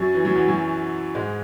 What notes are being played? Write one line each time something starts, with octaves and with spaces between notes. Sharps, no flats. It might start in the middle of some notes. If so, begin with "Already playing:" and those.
Already playing: F#2 F#3
E3
F#3
E2 E3
F#2 F#3
G#2 G#3